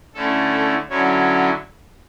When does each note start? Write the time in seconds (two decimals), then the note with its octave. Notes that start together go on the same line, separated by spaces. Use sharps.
0.14 D3 A3 C#4 E4 A4
0.52 A4
0.89 D3 F#3 C#4 E4 C#5